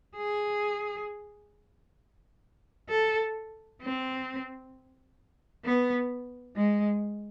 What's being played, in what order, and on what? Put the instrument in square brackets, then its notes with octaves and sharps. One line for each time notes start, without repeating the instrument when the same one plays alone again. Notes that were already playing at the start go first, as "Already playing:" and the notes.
[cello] G#4
A4
C4
B3
G#3